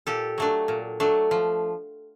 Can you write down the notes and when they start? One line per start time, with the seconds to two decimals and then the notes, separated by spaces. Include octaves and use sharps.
0.07 A#2 G4 A4
0.38 F#3 A3 D4
0.68 A#2
1.00 F#3 A3 D4
1.31 F3